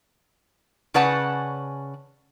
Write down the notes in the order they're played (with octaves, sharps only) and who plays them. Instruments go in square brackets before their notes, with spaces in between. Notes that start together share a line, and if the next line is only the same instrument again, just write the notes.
[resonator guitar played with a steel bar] C#3 C#4 B4 D5 F#5 A5